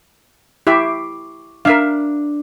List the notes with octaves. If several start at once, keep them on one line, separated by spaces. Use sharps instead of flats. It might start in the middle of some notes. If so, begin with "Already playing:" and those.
E4 G4 E5 C#6 D6 C7
D4 A#4 E5 F5